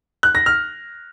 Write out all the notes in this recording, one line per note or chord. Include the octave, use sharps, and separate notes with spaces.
F#6
A#6
F6